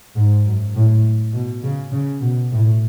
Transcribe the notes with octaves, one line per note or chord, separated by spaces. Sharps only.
G#2
F#2
A2
B2
C#3
C#3
B2
A2